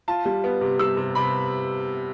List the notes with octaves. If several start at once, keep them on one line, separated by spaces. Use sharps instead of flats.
F4 A5
G3
B3
C3
G3 E6
C3
C3 B5